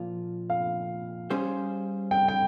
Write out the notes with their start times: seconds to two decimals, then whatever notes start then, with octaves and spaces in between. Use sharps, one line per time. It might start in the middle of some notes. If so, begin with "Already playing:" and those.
Already playing: A#2 F3 A#3 F4
0.50 F5
1.30 G3 C#4 G#4 C5
2.11 G5
2.28 G5